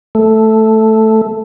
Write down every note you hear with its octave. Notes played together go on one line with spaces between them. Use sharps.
A3